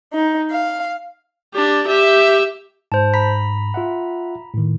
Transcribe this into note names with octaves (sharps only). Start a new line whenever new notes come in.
D#4
F5
D4 G4
G4 E5
G#2 C5 A5
A#5 B5 B6
F4 E5 F#5
A2 D#3